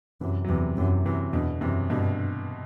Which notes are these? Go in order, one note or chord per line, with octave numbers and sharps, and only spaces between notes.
F#2 C3 E3
F#3
E2 C3 E3
F#2 C3 E3
F#2 C3 E3
E2 B2 D3
F#2 C3 E3
G2 B2 D3